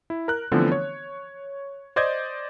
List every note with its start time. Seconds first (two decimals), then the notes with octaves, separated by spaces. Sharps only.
0.10 E4
0.28 A#4 F#6
0.52 D3 E3 F3 A3 B3 C4
0.72 C#5
1.96 C5 D5 D#5 G6 G#6